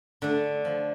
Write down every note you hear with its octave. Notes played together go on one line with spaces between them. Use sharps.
D3 A3 D4
F3